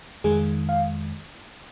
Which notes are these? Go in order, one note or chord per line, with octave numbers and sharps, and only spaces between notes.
F2 D#3 G#3 G#4
F5